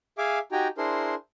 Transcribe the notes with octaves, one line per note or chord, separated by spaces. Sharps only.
G#4 E5 F5 G#5 D6
D#4 F#4 G4 G5 G#5 A#5
D4 E4 G#4 A#4 C5 C6